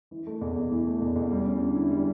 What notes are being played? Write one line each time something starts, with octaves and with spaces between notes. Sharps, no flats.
E3
A3
E2
E2
E3
A3
E2
E2
G3
C#4
D3
E4
G3